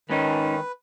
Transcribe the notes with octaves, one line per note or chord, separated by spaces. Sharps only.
G#2 D#3 C#4 D#4 B4